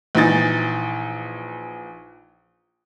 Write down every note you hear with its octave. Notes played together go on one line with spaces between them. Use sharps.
A#1 E3 D#4 A6